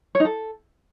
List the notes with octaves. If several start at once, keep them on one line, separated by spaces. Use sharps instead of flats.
C#5
D#4
A4